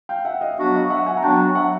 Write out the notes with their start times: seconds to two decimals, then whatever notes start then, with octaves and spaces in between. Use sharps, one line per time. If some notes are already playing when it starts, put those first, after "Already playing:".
0.09 F5 G5
0.25 E5 F#5
0.41 D#5 F5
0.58 F#3 B3 D4 F#4
0.74 D#5 F5
0.90 E5 F#5
1.06 F#5 G#5
1.17 A#5
1.23 F#3 B3 D4 F#4 G5 A5
1.55 E5 F#5